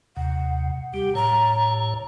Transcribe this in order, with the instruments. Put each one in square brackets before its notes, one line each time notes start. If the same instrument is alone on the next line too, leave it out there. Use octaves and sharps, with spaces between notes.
[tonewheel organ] D#2 C3 [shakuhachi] F#5
[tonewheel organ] G3 [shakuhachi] G4
[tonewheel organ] A2 C#5 [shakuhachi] A#5